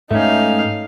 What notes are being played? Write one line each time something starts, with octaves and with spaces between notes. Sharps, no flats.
G#2 G#3 A3 C#4 D#4 F5